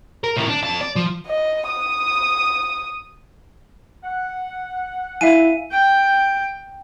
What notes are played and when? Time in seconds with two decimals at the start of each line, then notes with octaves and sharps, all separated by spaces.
0.24 A#4
0.37 A2 D#3
0.50 D4
0.64 F2 A5
0.81 D5
0.96 F3
1.27 D#5
1.68 D#6
4.04 F#5
5.21 E4 E5 F5 G#5 D#7
5.72 G5